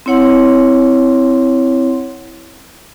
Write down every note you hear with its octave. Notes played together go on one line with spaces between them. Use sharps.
C4 E4 C#5 F#5 C6